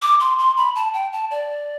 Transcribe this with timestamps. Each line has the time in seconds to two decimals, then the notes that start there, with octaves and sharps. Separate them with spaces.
0.02 D6
0.20 C6
0.39 C6
0.57 B5
0.75 A5
0.94 G5
1.13 A5
1.31 D5